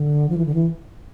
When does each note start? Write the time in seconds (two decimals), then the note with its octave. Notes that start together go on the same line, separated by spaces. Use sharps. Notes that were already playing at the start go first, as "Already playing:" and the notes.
Already playing: D3
0.29 F3
0.38 E3
0.46 D3
0.54 E3